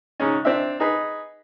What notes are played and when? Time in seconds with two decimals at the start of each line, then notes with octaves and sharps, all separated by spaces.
0.20 G#2 C#3 C#4
0.45 C4 D4 E5
0.80 D#4 G#4 B4